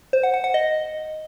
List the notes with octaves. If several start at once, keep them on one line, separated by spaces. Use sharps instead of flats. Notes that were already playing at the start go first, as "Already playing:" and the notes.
C5
F#5
F#5
F#5
D#5